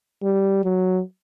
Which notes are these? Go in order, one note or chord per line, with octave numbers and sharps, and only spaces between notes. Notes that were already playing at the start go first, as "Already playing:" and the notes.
G3
F#3